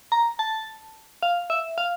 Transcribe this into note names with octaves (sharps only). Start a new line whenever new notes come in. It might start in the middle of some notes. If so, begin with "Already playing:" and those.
A#5
A5
F5
E5
F5